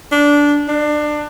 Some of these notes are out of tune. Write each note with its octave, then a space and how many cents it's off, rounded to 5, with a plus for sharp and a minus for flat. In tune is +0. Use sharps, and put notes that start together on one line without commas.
D4 -15
D4 +25